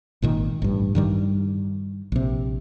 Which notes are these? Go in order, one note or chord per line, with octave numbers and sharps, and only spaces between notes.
G#1 A#2 D#3
A1 G2
G2 D#3 G3
A#1 C3